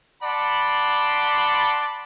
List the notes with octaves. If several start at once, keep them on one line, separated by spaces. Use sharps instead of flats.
D5 F#5 A5 B5 C6